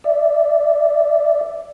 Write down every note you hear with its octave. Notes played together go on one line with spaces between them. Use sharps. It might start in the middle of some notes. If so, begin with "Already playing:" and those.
D5 E5